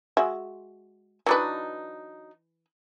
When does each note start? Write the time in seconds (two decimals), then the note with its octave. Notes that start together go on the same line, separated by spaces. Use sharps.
0.17 G#3 F#4 E5
1.26 E3 F#3 D4 D#4 B4